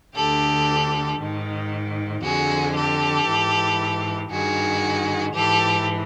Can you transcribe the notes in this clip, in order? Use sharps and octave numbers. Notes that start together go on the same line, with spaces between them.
D2 D3 G4 A4
G#2 D#3
F2 D3 F#4 G#4
G4 A4
G#2 E3
G2 D#3 F#4 G#4
G#2 E3 G4 A4